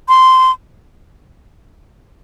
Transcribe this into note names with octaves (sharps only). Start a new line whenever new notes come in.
C6